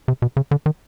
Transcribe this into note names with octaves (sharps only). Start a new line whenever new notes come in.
C3
B2
C#3
D3
D#3